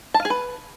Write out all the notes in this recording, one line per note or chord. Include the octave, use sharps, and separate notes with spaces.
A5
F5
G#4
B4